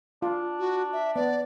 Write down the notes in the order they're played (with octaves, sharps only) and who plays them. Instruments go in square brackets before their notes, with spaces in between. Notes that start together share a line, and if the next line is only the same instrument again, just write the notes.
[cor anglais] D4 [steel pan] F4
[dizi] F#4
E5
[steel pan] B3 [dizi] D5